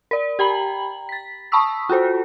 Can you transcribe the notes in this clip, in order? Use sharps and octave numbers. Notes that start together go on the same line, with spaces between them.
A#4 D5
G4 G5 A#5 B5 F#7
A6 B6
A5 B5 C#6 D#6 E6 B6
F4 F#4 A4 C5